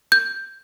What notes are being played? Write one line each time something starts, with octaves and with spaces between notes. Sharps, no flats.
G6